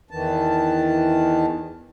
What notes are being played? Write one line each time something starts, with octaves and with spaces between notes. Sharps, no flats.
E2 D#3 E3 A5